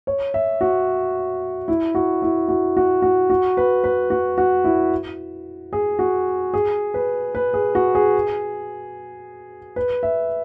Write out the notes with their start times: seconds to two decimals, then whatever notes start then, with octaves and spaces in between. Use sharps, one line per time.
0.07 C#5
0.34 E5
0.61 F#4
1.68 E4
1.95 F#4
2.22 E4
2.49 F#4
2.77 F#4
3.02 F#4
3.30 F#4
3.57 B4
3.84 B4
4.10 F#4
4.38 F#4
4.64 E4
5.73 G#4
5.99 F#4
6.54 G#4
6.94 B4
7.35 B4
7.54 G#4
7.75 F#4
7.95 G#4
9.76 B4
10.03 E5